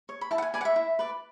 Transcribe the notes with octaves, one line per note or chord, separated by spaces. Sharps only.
C#5
B5
E4 A5
F#5
G#5
B4 D5 G#5
F#5
E5
E4
B4 D5